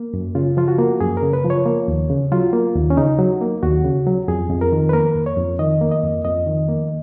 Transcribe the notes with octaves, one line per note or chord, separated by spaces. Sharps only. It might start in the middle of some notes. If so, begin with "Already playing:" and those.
Already playing: A#3
F#2
C#3 F4
F3 F4
F#4
A#3
F#2 G#4
A#4
C#3
B4
F3
C#5
A#3
D#2
C#3
F#3 F4
A#3
D#2
C#4
C#3 D#4
F#3
A#3
D#2 F#4
C#3
F#3
F2 G#4
F2
A#4
D#3
B4
A#3 A#4
F2
C#5
F2
D#3 D#5
A#3
D#5
F2
F2 D#5
D#3
A#3